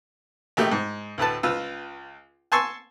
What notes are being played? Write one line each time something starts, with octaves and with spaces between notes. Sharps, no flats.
A#1 D#3 A3 G4
G#2
D2 A2 B4 A5
C#2 F4 B4 E6
G#5 A5 C6 C#6 E6